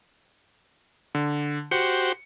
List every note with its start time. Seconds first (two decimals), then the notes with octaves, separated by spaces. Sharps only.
1.15 D3
1.71 F#4 G4 C5 C#7